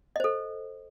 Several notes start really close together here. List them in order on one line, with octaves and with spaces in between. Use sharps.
D#5 C5 A4